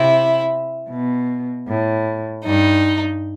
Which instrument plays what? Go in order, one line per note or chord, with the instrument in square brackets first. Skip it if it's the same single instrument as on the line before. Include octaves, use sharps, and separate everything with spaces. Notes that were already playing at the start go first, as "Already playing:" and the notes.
Already playing: [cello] C3 [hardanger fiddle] E4
[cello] B2
A2
[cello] G2 [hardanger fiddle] D#4